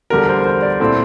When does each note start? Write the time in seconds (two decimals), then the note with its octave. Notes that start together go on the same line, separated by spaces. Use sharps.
0.10 E2 D3 G3 A#4
0.29 C5
0.39 A#4
0.45 C5
0.62 D5
0.80 A#2 A3 C4 E4